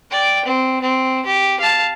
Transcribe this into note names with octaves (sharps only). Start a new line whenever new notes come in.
D5 G5
C4
C4
G4
F5 A5